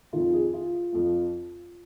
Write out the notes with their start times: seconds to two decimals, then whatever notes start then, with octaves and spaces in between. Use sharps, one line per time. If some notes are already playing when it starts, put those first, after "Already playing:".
0.13 F2 D#3 F4
0.33 G#4
0.54 F4
0.92 F2 F3